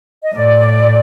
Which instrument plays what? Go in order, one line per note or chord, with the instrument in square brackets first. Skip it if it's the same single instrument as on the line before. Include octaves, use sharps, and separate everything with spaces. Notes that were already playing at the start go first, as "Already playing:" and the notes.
[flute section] D#5
[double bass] A2 [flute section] D5